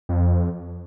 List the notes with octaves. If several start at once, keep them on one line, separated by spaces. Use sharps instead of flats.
F2